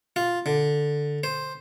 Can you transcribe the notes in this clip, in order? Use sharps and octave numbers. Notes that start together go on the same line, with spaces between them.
F4
D3
C5